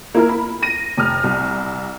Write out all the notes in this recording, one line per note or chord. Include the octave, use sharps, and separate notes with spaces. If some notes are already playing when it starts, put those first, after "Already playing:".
A#3 E4 A#4
B5
A#6 D#7
F1 F6
C2